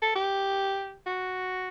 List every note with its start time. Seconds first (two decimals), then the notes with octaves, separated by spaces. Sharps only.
0.02 A4
0.15 G4
1.07 F#4